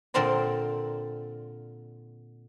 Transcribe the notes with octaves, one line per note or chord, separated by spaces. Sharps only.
A#2 D3 C4 A#4 C5 D5